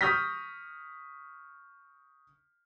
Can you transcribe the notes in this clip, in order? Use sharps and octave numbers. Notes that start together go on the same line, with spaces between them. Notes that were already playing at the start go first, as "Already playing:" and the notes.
C#6 D#6 F6 G6 A#6 B6